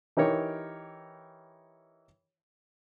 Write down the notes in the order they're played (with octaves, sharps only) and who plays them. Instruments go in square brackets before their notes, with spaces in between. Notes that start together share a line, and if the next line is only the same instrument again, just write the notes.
[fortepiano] E3 D#4 G4 A#4 C#5